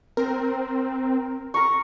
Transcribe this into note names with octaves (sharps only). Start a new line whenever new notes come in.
C4 A#4
A#4 A#5 C#6